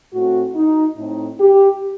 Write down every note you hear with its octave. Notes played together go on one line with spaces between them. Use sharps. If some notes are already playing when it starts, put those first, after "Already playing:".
A2 A3 C4 F#4
D#4
A2 A3 C4 D#4
G4